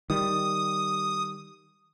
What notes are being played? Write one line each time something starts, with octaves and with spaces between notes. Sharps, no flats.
D#3 G3 D#6